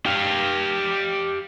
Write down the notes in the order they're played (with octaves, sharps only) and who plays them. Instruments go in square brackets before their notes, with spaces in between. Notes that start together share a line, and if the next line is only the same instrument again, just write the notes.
[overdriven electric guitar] G4 F5